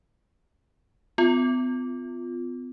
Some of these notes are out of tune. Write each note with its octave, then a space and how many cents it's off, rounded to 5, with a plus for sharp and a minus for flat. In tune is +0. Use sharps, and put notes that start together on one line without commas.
B3 +45 F4 +0